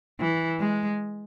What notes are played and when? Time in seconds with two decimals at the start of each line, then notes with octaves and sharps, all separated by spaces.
0.20 E3
0.60 G#3